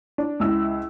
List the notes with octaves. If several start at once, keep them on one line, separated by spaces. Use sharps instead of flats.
D4
C#2 E4 E6